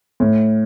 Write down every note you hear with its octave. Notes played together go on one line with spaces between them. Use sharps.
A2